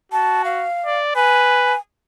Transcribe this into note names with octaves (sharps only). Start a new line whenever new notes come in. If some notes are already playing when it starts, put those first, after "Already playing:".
F#4 A5
F5
D5
B4 G#5